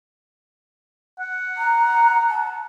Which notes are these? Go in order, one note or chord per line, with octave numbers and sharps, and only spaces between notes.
F#5
A#5
A5